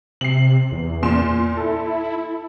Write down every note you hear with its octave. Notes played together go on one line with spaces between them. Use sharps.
C3 C7 F#7
E2
A#2 C6 E7
E4 A4